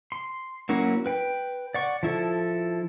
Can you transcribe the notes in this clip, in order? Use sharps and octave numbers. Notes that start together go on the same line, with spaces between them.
C6
F#3 A#3 C#4 E4 F#4
B4 G5
D5 F#5 C#6
F3 E4 A4